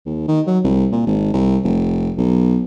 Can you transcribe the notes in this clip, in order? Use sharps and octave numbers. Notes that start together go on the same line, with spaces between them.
D#2
D#3
F#3
C2
A#2
G#1
C2
F1
B1